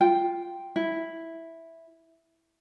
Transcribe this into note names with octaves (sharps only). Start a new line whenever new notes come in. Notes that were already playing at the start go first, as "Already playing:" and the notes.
F4 G5
E4